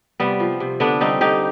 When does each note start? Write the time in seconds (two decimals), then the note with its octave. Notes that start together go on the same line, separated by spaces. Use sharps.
0.20 C3 G3 B3
0.40 F3
0.60 C3
0.80 D3 B3 D4
1.01 G3 C4 D#4
1.21 D3 D#4 G4